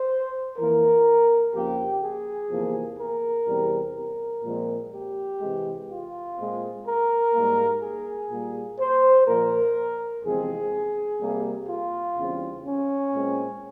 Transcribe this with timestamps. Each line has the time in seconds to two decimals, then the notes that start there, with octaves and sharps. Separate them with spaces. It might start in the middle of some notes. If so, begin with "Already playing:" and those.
Already playing: C5
0.57 F2 E3 A#3 A#4
1.53 F2 C#3 F3 A#3 G4
2.01 G#4
2.50 E2 C3 F3 A#3
2.98 A#4
3.47 E2 C3 G3 C4
3.95 A#4
4.44 A#2 F3 G#3 C4
4.92 G4
5.40 C3 E3 G#3
5.89 F4
6.36 A#2 G#3 C4
6.86 A#4
7.33 G#2 G3 A#3
7.81 G#4
8.31 A#2 G3 A#3
8.79 C5
9.26 A#2 F3 A#3 A#4
10.23 E2 C3 F3 G#3 C4 G#4
11.20 C3 G3 A#3
11.68 F4
12.17 E2 C#3 G3 C4
12.65 C#4
13.13 A#2 G#3 C4